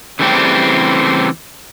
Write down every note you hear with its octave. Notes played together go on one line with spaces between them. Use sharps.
C#3 E3 G3 A3 C4 G4